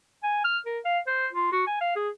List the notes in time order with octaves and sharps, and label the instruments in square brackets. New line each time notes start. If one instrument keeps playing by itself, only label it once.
[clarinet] G#5
F6
A#4
F5
C5
F4
F#4
G#5
F5
G#4